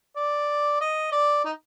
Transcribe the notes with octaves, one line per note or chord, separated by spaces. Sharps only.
D5
D#5
D5
D#4